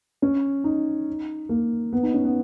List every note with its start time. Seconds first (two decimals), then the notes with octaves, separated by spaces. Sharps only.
0.22 C#4
0.64 D#4
1.49 A#3
1.93 B3
2.03 D#4
2.14 C#4
2.24 B3